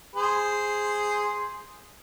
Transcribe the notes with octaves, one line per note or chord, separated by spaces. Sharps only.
G#4 C5